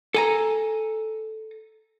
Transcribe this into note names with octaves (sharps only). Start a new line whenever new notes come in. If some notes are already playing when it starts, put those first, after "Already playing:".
A4 G#5 A#5